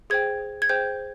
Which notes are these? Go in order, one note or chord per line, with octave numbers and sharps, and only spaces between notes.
G#4 C5 G5 G#6
G#6
G#4 C5 G5 G6